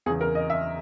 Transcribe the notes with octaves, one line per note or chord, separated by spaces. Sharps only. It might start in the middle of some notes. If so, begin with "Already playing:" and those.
E2 C#3 E3 G#4
A#4
D#5
E5